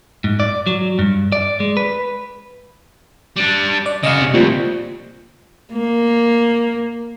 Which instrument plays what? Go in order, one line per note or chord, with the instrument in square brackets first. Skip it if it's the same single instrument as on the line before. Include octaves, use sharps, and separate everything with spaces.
[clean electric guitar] G#2
D5
F#3
G2
D5
G#3
B4
[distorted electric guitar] G3 D4
[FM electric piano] D5
[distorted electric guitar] C#3 F#4 [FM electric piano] D#5 F5
[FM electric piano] C3
[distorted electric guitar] D2 [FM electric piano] A#2 F3 G3
[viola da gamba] A#3